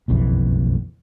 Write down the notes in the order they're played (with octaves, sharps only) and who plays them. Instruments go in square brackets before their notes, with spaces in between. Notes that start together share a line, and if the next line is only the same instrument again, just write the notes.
[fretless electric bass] F#1 B1 F2 E3